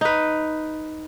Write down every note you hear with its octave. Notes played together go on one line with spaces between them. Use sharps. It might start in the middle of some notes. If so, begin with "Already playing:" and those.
D#4 B4